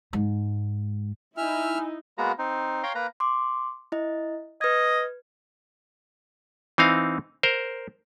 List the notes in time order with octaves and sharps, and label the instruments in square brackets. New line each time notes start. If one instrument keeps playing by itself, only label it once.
[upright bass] G#2
[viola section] D#4 E4 [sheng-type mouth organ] E5 F6 [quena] G#5
[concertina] G#3 A#3 B3 F#4 A#5
C4 D#4
C#5 F5 G5 A#5 C6
A#3 B4 A#5
[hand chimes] C6 D6
E4 D#5
[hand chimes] B4 G#6 [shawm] D#5
[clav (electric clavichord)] E3 C4 D#4 F5
A#4 C5